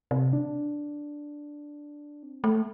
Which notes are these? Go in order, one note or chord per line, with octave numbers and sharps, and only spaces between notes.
C3
D4
C4
A3